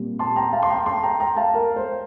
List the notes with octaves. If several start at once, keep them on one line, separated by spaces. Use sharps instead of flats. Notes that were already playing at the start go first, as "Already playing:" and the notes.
Already playing: A#2 G3 C4
A5 C6
G5 A#5
F5 A5
C6
G5 A#5
A5 C6
G5 A#5
G5 A#5
F5 A5
A#4
C5